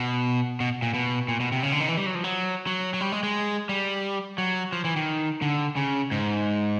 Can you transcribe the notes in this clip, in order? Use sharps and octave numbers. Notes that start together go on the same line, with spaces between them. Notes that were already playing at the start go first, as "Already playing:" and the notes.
Already playing: B2
B2
A#2
B2
A#2
B2
C3
C#3
D3
D#3
E3
G3
F#3
F3
F#3
F#3
F#3
G3
G#3
G#3
G3
F#3
F3
E3
D#3
D3
C#3
G#2